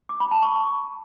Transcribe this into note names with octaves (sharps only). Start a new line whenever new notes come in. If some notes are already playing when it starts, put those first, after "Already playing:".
D6
B5
A5
C#6